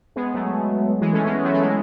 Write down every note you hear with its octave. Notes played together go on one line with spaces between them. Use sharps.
G#3 B3
F#3 A3
E3 G#3
A3 C#4
G#3 B3
F#3 A3
A3
E3 G#3